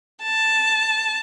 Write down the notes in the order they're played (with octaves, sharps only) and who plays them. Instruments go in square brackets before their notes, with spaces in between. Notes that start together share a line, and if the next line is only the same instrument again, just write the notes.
[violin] A5